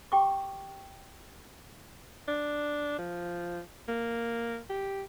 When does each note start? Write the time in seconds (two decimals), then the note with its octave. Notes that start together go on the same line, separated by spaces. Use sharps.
0.12 G4 G5 C#6 D6
2.28 D4
2.99 F3
3.88 A#3
4.70 G4